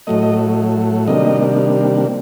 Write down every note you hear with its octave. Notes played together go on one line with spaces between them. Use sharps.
A2 F#3 A3 D#5
C3 D#3 G3 A#3 D4 D#5